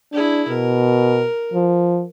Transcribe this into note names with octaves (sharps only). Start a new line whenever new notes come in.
D4 E4 G#4
B2 A#4
F3